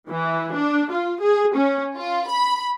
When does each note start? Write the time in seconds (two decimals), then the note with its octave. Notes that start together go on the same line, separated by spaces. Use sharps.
0.11 E3
0.53 D4
0.91 F4
1.21 G#4
1.55 C#4
1.96 F4
2.27 B5